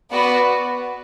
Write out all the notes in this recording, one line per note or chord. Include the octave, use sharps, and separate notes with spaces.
B3 F#4 B4 D5